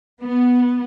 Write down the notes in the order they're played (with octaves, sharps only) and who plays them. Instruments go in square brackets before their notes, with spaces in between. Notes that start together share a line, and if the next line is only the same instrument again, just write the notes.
[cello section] B3